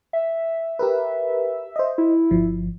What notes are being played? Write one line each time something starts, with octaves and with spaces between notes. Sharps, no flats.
E5
G4 A#4 B4
C5 D#5
E4
G1 F3